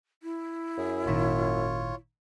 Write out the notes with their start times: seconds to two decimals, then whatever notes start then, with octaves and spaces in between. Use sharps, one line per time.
0.23 E4
0.77 F#2 G#4
1.06 G#1 A#2 D#3 F4 C#5